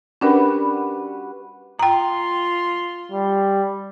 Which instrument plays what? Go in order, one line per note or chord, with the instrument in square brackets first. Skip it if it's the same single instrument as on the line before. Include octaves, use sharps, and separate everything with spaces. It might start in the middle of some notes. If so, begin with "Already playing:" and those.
[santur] G3 F#4 B4 [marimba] C#4 D4 A#4
[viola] F4 C6 [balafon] G5 A#5
[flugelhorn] G3